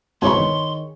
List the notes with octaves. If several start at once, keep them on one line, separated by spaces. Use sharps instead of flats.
G1 C2 G#2 G#4 C#5 B5 C6
D#3